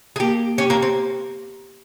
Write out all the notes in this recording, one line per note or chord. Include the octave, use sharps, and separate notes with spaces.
G#4
A#3 G4
C#4 G4
A#3
C4